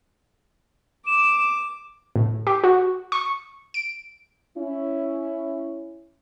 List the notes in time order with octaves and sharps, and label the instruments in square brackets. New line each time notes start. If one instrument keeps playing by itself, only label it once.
[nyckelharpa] D6 [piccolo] E7
[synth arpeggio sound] A2
G4
F#4
C#6
D7
[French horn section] C#4 E4